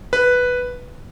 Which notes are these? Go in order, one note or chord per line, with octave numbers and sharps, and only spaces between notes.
B4